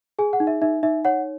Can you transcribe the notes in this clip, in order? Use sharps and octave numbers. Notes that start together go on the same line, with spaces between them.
G#4 G#5
F#5
D#4
E5
D#4 E5
D#4 E5
C#5 F#5